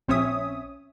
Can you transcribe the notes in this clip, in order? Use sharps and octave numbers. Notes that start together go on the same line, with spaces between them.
A#1 C4 C#4 C#5 E5 D#6